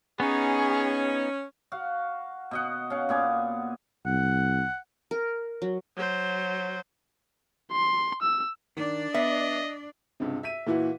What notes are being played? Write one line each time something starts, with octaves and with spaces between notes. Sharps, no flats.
B3 C#4 D#4 G#4
F#4 F5
B2 D#5 F#5
C#4 F5 F#5
A#2 B3 G#5 D6
C2 F#5
A#4
F#3
F#3 C5
C6
E6
D#3 D4 D5
B3 D#5 E5
C#2 G2 C3
E5 B6 D#7
A#2 E3 E4 F#4